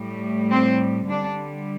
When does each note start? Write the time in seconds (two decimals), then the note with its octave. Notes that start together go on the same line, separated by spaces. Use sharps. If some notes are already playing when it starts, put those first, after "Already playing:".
Already playing: A2 G3
0.51 C4
1.09 D3 G3 D4